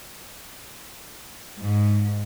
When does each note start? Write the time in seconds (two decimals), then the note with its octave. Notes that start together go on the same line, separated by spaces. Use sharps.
1.60 G#2